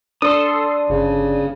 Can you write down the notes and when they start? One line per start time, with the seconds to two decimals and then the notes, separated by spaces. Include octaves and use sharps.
0.22 D4 A4 C6 D#6
0.89 G1 C#3